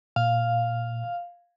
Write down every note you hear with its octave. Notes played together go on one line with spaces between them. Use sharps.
A#2 F5